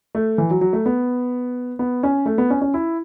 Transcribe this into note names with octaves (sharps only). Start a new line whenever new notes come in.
A3
E3
F#3
F#3
A3
B3
B3
C#4
A3
B3
C#4
C#4
E4